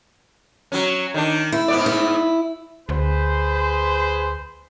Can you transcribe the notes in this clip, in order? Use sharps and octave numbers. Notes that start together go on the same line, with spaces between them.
F#3 C#4
D#3 D4
E4
G#2 B3 D5
E4
D2 G#4 B4 C5